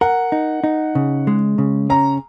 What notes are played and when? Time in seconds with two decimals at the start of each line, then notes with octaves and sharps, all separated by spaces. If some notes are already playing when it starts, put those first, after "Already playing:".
0.01 A#4 F#5
0.32 D#4
0.64 D#4
0.95 C#3
1.27 G#3
1.58 C#3
1.90 C#4 A#5